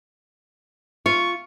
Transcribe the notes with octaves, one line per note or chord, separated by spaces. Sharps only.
F4 C#6